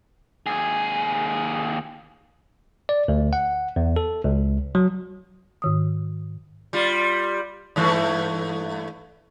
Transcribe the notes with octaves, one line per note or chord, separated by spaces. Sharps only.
D#2 G#4
D5
D2
F#5
E2
A4
C#2
F#3
G#2 D#3 D#6
G3 F4
G2 E3 A3